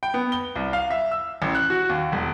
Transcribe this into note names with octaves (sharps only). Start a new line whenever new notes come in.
G5
B3
G7
C2
F5
E5
E6
A1
F#6
F#4
D#2
E1